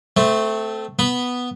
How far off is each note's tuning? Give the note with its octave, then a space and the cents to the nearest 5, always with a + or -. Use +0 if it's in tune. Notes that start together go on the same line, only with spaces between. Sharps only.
A3 +0 C4 -20
B3 +0 B5 +0